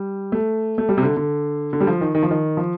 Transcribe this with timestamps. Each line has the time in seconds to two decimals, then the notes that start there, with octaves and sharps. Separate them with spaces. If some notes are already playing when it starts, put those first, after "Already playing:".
Already playing: G3
0.32 A3
0.78 A3
0.89 G3
0.98 C3
1.03 D3
1.17 D3
1.73 D3
1.81 G3
1.87 F3
2.01 D#3
2.15 D#3
2.23 F3
2.31 D#3
2.57 F3